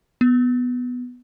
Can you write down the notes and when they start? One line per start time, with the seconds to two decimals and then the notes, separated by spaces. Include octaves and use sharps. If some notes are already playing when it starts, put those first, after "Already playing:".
0.21 B3